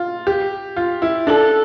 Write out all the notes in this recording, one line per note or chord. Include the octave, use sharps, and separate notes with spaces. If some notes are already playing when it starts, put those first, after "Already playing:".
Already playing: F4
G4
F4
E4
D4 A4